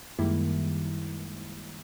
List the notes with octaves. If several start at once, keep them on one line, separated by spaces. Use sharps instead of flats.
F#2 D#3 G3 G#3 A#3 E4